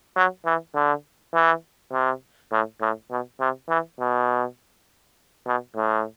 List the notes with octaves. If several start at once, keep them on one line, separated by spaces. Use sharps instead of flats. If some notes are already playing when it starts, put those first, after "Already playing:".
F#3
E3
D3
E3
C3
A2
A2
B2
C3
E3
B2
B2
A2